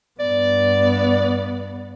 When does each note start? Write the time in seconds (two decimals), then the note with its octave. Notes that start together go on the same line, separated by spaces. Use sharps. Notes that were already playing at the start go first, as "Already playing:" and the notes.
0.20 G2 B3 D5